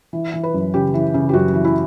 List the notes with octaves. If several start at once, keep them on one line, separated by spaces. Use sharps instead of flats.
E3
E3
B4
F#2
C#3 G4
E3
C#3
G4
F#2 F#4
E3
E4